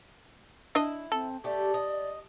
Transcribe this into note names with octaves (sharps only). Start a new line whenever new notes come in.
D4 E4 D#5
C4 A4
A3 G4 D5
D#5